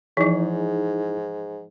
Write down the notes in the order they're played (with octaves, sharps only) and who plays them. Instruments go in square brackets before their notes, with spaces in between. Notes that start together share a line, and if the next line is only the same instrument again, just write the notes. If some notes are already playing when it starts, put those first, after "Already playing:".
[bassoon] G#2 [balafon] E3 F3 [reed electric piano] D#4 E4 G#4